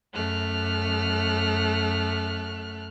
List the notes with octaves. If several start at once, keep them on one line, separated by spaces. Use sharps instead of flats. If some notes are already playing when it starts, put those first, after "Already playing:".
F#2 A3 F6 F#6